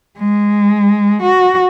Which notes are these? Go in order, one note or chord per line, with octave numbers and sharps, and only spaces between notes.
G#3
F#4